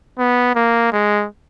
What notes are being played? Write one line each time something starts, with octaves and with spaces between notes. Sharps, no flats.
B3
A#3
G#3